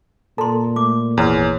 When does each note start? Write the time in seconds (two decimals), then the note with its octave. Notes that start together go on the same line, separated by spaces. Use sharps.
0.38 A#2 A4 A5 A#5 C6
0.76 A3 D6
1.17 G#1 E2 C#5 F6